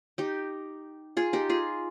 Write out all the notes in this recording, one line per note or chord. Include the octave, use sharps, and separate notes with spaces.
D#4 G4
F4 G#4
D#4 G4
F4 G#4